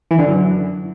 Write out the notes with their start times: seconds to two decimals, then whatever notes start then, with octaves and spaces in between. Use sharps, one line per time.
0.11 E3
0.19 D3
0.27 F#2